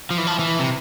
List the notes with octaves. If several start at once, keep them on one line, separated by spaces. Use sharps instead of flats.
F3
E3
F3
E3
C3